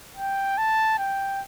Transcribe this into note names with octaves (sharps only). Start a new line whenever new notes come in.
G5
A5
G5